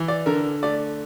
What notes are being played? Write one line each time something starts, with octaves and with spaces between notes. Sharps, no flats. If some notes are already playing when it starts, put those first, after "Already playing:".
Already playing: E3
D5
D3 A#4
A3 D5